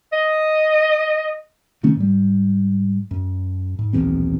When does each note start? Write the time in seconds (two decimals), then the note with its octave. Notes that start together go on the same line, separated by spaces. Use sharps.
0.13 D#5
1.83 C3 D#3 A3 C#4
1.97 G#2 G3
3.11 F#2
3.79 G#2
3.93 D#1 B1 E2 C4